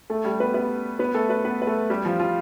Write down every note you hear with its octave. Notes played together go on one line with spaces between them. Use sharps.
A3 A4
G3 G4
B3 B4
B3 B4
B3 B4
A3 A4
B3 B4
B3 B4
B4
A3 A4
G3 G4
F3 F4
F3 F4